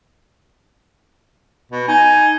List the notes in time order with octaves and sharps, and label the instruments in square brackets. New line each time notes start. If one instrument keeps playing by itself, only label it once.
[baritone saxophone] B2
[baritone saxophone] D#4 [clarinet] G#5